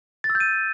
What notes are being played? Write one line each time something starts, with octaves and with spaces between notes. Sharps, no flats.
A6
E6
G6
D#7